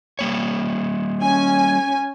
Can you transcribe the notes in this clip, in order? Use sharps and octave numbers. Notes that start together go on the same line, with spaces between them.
G3 A#3 C#5
C#4 G#5